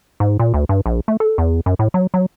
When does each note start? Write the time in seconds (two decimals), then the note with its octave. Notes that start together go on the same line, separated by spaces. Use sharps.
0.20 G#2
0.39 A#2
0.54 D2
0.69 G2
0.86 A#1
1.08 A3
1.20 A4
1.38 E2
1.66 F#2
1.79 A2
1.94 F#3
2.14 F#3